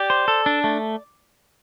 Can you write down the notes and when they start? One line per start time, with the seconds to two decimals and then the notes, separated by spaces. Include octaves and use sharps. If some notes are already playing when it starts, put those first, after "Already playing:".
Already playing: G4 D5
0.10 C5
0.28 A4
0.46 D4
0.64 A3